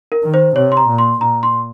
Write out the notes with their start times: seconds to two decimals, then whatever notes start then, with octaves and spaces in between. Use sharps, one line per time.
0.12 A#4
0.23 D#3
0.34 C5
0.55 C3 C#5
0.72 C6
0.77 A#5
0.88 A#2
0.98 C6
1.20 A#2 A#5
1.43 C6